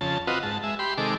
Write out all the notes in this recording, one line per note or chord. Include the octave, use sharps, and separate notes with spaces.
F2 C#3 A5
C4 F4 F#4 B4 D#5
G#2 A5
G#3 E5
G4 B5 C6
C3 D#3 G#3 A4 D6